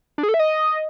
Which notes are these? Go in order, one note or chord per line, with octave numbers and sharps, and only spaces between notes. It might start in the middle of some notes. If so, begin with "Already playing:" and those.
D4
G#4
A4
E5
D#5